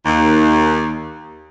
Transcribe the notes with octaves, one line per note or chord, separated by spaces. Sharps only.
D#2